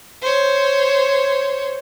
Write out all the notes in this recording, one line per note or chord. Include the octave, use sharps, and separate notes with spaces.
C5 C#5